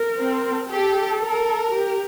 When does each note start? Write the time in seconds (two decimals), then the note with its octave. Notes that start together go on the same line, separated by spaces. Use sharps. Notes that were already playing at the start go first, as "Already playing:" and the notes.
Already playing: A#4
0.17 C4
0.69 G4 A4
1.21 A#4
1.71 G4